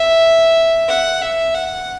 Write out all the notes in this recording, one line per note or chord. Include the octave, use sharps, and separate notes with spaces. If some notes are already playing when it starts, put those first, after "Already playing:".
Already playing: E5
F#5
E5
F#5